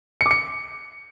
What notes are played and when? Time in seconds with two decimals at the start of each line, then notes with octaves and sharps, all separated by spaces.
0.21 C#7
0.26 D6
0.31 C#7